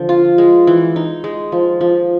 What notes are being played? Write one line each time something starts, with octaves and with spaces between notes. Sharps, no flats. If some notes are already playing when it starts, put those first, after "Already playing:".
Already playing: D3 F3
F4
G#3
E3
D#4
G#3
F3
F3